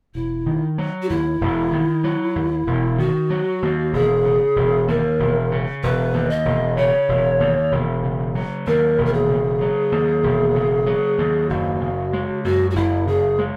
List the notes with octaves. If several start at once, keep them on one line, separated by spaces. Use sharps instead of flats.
E1 E4
D#3
F#3
F#4
D#2 E4
E1
D#3
F#3
D#2
E1
D#3 F#4
F#3
D#2
E1 G#4
C#3
E1
D#2 A#4
E1
C#3
E1 B4
D#2
D#5
E1
C#3 C#5
E1
D#2
E1
C#3
F#3
D#2 A#4
E1
A#4
G#4
C#3
F#3
D#2
E1
C#3
F#3
D#2
F#1 F#4
C#3
G#3
F#2 F#4
F#4
F#1 E4
C#3 G#4
G#3